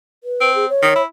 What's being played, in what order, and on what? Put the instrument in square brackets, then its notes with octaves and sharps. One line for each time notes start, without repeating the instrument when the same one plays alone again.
[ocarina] B4
[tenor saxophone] C4
[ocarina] G#4
C#5
[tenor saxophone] D#3
E4